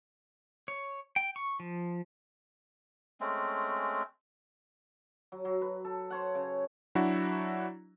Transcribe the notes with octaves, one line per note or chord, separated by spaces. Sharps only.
C#5
G5
C#6
F3
G#3 A3 C4 C#4
F#3
F#3
B4
A4
C5 C#5 F#5
C#3
F#3 D4 E4 F#4